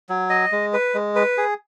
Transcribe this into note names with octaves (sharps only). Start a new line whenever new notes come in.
F#3
D#5
G#3
B4
G#3
B4
G#4